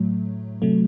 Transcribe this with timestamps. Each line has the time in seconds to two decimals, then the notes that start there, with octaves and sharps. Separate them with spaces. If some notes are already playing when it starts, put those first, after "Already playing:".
Already playing: A2 F#3 A3
0.62 C3 F#3 A3